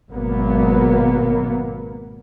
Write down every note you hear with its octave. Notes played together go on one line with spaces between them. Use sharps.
G#1 B2 F#3 A#3 B3